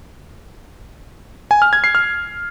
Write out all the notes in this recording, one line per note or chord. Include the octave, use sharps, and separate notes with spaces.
G#5
F6
G#6
C7
F6